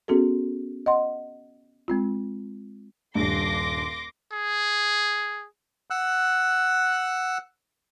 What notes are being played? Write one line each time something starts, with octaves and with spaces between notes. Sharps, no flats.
B3 C#4 F#4 G#4 A4
D#5 F#5 C6
G#3 C4 F4
D#1 G2 C6 D6 A#6
G#4
F#5 E6 F#6